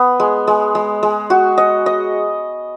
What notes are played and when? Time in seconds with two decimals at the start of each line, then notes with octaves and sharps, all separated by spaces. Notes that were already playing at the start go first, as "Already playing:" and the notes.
Already playing: B3
0.20 G#3
0.47 G#3
0.75 G#3
1.03 G#3
1.30 F#4
1.58 D#5
1.86 D#5